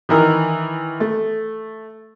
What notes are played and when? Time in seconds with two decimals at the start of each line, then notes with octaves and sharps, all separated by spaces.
0.09 D#3 E3 A#4
1.00 A3